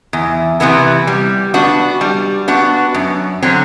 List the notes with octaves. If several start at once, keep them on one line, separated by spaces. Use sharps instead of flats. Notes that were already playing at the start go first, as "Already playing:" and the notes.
E2
C3 E3 B3 E4
G3
B3 D4 F#4
G3
B3 D4 F#4
F#2
D3 F#3 C4